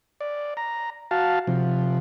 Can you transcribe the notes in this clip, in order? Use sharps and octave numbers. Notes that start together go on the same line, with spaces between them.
D5
A#5
F#4 F5 A5
C3 F3